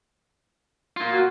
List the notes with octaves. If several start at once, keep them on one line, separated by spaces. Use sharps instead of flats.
A#3 F4
F#4